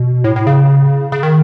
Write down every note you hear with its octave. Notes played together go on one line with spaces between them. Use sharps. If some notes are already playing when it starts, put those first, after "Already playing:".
Already playing: B2
A2
A2
C#3
C#3
D#3